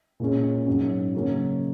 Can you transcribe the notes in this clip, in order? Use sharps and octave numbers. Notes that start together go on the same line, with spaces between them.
A#2 G#3 C#4
G#2 F#3 C#4
C#3 F#3 A#3 C#4